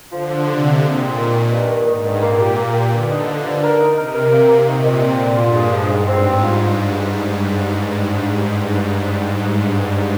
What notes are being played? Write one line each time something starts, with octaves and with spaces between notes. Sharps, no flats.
D3 F3
F3
C3 F4
F3
A#2 G#3
C4
D#3
D#3
G2
D#3
G#2 D#3
G2
A#2 A#3
G4
A#3
G4
G2 D3
D#4
F3
G2
A#4
D#4
C3 A#4
A#4
A#3
A#3
A#2 D#3
D#3
C4
D3
G2 F4
G#3
F3
G#2
G#2 C4
C4
F4